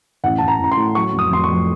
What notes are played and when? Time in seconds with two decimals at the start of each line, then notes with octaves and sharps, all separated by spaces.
0.24 A1 F#5
0.38 A1 A5
0.48 A#5
0.59 A1 A#5
0.72 C6
0.77 A2
0.95 F#3 C#6
1.13 F1
1.19 D#6
1.31 F1 C6
1.44 C#6
1.49 F2